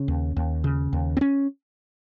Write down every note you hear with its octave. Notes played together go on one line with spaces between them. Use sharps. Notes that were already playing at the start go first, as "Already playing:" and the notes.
Already playing: C#3 C#4
D#2
D#2
C#3
D#2
C4
C#4